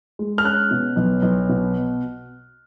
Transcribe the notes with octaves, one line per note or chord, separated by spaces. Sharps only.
G#3
F6
C#4 F#6
B2
B1
B1
B2